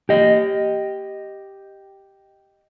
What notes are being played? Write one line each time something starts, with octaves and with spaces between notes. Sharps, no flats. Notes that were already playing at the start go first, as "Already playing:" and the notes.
G4 D#5